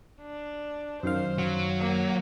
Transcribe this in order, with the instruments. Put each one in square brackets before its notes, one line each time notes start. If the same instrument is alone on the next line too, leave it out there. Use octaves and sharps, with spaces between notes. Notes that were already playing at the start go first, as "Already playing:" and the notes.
[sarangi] D4
[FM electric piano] F#2 D#3 F5 [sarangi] C5
[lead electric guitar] F#3
[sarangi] A#3